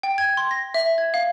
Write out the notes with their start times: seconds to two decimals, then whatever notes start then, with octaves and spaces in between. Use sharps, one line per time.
0.03 G5
0.18 G#6
0.37 C6
0.51 A#6
0.74 E5
0.98 G#6
1.14 F5